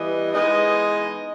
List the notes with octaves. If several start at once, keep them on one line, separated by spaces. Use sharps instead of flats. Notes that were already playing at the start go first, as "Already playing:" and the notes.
Already playing: E3 G3 B3 D#5
E3 G#3 B3 D#4 D#5